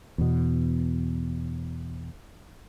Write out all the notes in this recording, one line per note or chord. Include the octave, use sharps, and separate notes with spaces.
E2 B2